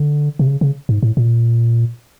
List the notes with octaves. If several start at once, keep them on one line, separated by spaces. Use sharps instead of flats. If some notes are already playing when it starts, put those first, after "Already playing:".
Already playing: D3
C3
C#3
C#3
G#2
A2
A#2